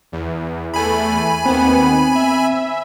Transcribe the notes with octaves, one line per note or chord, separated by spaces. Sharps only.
E2
E2 A3 G#5 B5
D#2 B3 C4
E5